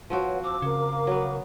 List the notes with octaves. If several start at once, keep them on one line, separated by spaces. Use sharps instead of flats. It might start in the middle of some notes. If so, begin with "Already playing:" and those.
F3 C4 F#4 B4 C#5 F#5
C5 A5 D6 E6
C#3 A#4 F5
F#3 B3